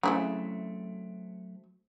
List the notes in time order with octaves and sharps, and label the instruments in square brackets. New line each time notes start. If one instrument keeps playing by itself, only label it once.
[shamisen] C#3 E4 G#4 [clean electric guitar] F#3 A3 C4